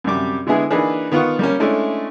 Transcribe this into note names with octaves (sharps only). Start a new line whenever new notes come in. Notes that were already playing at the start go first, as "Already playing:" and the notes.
F#2 C3 G3 D6
D3 G#3 B3 E4 G#4
E3 A#3 D4 D#4 G#4 B4
D#3 B3 F4 F#5 C#6
G3 A#3 C#4
G#3 A3 C#4 D4 E4